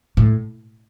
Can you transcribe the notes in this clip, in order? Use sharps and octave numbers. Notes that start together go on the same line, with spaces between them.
A2